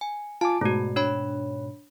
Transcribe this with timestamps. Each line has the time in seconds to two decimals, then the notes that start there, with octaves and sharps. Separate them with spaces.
0.01 G#5
0.41 F4 G#5 A5 D6
0.61 G#2 B2 A3 F#4
0.96 D4 C#5 B5